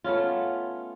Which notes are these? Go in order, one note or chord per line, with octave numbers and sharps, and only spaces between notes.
A3 B3 C#4 F4